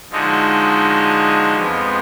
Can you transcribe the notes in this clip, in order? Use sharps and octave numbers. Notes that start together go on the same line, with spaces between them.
D3 F3 G#3 D#4 F#4
F2 F3 G#3 B3